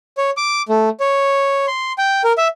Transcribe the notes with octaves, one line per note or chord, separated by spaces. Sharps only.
C#5
D6
A3
C#5
C6
G5
A#4
E5